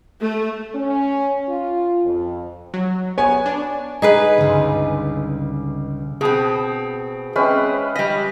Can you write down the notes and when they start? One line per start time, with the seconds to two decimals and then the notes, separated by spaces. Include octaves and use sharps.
0.24 A3
0.75 C#4
1.49 F4
2.05 F2
2.74 F#3
3.18 B3 C#5 G#5
3.46 D4
4.02 D#4 G#4 B4
4.38 G1 C#2
6.21 B2 C4 G#4 A5 D#6
7.36 G#3 C4 C#4 B4 E5 G5
7.96 G3 D#5 B6